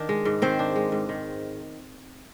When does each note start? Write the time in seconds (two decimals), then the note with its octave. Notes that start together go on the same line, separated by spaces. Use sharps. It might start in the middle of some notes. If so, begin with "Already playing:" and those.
Already playing: D#3 D4
0.09 G#3
0.25 G#2
0.42 D#3 C4 C5
0.59 D4
0.76 G#3
0.92 G#2
1.09 D#3